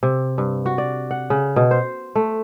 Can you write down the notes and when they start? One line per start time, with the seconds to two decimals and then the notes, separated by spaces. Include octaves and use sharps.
0.03 C3
0.38 G2
0.66 F#4
0.78 D5
1.11 F#5
1.30 C#3
1.56 B2
1.71 C5
2.15 A3